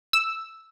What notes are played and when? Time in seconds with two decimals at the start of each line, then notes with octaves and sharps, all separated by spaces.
0.13 E6